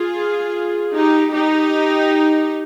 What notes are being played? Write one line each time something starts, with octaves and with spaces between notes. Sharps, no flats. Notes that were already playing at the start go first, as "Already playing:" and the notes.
Already playing: F4 G#4
D#4 G4
D#4 G4